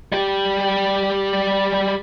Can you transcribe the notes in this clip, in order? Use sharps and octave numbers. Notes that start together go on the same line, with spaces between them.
G3 G4